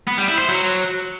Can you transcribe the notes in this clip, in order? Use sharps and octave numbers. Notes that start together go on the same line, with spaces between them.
B3
G3
E4
C5
F#3